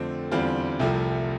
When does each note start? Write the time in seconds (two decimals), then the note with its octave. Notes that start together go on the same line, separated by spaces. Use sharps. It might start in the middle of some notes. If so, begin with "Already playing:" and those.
Already playing: F2 D3 A3 C4
0.31 E2 D3 G3 C4 F4
0.79 C2 C3 F3 A3